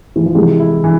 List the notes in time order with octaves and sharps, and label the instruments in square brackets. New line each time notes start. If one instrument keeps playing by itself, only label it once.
[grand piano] E3
F3
[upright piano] C3 [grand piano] E3 G#3
[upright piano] E4
E3